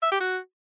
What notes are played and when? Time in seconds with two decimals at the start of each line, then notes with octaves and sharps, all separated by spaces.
0.03 E5
0.12 G4
0.21 F#4